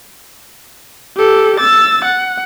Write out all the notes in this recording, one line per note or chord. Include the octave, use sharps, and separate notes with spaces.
G4 A4
E6 A6
F#5